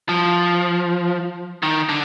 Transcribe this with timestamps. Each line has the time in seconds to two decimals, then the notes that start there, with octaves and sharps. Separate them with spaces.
0.09 F3
1.63 D#3
1.89 D3